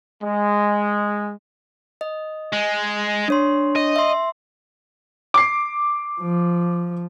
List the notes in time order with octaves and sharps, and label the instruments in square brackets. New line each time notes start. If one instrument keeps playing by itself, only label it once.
[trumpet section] G#3
[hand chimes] D#5
[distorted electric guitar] G#3
[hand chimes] D4 C#5 C6
[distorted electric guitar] D#5
[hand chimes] E5 C6
[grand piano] D6 C7
[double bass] F3